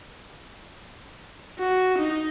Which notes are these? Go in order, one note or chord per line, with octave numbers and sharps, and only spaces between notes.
F#4
D#4